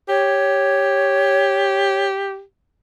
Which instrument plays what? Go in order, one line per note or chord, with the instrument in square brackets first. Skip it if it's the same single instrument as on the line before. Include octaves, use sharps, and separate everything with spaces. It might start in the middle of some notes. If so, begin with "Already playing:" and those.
[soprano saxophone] G4 [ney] C#5